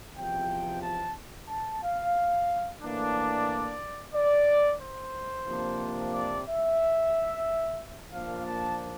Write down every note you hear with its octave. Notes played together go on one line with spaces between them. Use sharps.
E2 C3 F3 G5
A5
A5
F5
A2 E3 A#3 D4
D5
D5
C5
C3 F3 A#3 D4
D5
E5
A#2 F3 A#3 D4 F5
A5